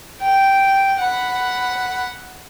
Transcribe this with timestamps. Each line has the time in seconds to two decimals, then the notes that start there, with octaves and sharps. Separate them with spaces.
0.21 G5
0.99 F#5 B5